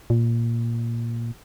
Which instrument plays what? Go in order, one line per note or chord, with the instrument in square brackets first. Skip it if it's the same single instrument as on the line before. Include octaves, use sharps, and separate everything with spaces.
[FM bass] A#2